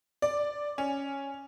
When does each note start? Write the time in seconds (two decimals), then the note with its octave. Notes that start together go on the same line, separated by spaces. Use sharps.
0.22 D5
0.78 C#4